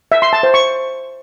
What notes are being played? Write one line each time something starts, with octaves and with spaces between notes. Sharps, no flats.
E5
C6
A5
C5
C#6